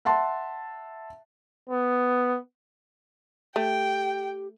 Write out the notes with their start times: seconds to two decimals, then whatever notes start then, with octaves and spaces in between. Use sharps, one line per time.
0.05 E5 F#5 A5 C6
1.70 B3
3.56 A3 G4 G5